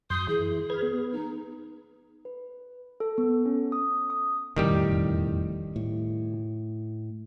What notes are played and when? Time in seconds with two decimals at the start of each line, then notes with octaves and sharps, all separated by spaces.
0.10 F#2 C6 D#6 G6
0.28 E3 G#4
0.70 B4 F6 G#6
0.83 B3
1.12 D#4
2.25 B4
3.00 A4
3.18 B3
3.46 C#4
3.72 D#6
4.10 D#6
4.56 E1 F2 A2 D#3 G3 G4
5.76 A2